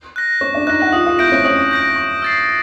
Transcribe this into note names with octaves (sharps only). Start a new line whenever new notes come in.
F#6 A#6
C#4 C#5 C#6
D4 D5
D#4 D#5 F#6 A#6
F#5
F4 F5 D#6
F4 F5
E4 E5 G6 A#6 D7
C#4 C#5
C#4 C#5 D#6
G6 A#6 D7
C#6
E6 A6 C7